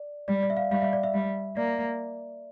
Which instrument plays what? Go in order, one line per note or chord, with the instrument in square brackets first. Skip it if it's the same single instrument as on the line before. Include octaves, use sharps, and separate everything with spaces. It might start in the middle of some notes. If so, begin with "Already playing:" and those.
Already playing: [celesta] D5
[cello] G3 [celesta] D5
[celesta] D5
E5
F5
[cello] G3 [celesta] F5
[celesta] E5
D5
E5
[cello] G3
[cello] A#3 [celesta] D5